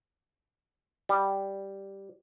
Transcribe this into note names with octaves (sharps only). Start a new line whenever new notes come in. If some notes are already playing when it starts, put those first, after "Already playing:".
G3